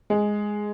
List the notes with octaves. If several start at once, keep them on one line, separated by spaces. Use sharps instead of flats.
G#3